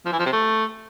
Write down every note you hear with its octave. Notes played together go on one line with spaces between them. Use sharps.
F3
E3
F3
C3
A3